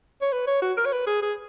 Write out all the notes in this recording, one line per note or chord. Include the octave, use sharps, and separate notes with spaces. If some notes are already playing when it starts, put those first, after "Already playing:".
C#5
B4
C#5
F#4
A#4
C#5
B4
G#4
G#4